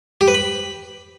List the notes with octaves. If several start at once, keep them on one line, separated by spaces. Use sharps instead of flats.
G4
B4
B5